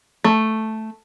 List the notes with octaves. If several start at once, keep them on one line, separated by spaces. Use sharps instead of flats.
A3